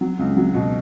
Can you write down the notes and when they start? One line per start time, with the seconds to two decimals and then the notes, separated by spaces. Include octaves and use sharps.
0.01 F#3
0.19 C#2
0.37 F#3
0.54 B2